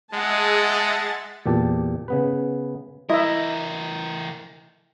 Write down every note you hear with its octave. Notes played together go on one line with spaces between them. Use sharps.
G#3 G#4 D#5 E5 F#5 A5 A6
E2 A#2 G4 A5
C#3 B3 B4
E3 E4 A#4 D#5 E5